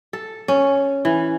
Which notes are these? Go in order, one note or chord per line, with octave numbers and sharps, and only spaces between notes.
A4
C#4
E3